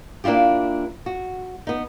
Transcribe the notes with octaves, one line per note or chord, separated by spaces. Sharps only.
A#3 D4 E4 F4 G4
F#4
B3 D#4